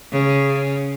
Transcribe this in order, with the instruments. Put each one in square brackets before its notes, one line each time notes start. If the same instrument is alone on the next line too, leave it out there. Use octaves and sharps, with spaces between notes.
[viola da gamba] C#3